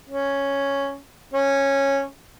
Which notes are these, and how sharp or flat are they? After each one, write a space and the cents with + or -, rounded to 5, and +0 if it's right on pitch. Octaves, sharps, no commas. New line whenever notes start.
C#4 +0
C#4 -10